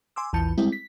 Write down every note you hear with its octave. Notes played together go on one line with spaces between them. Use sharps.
G#5 C6 D6 E6
A#1 E2 E3 A5 G6 C#7
G3 G#3 C4 E4
B6